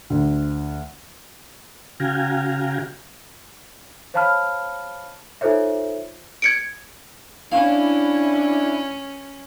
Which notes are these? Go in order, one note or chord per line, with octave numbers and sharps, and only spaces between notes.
D2
C#3 F#4 F5 G5 G#5 A#5
C5 C#5 F5 A5 B5 F6
D#4 F4 A4 C5 C#5 E5
G#6 C#7 D7
C#4 D4 E4 F5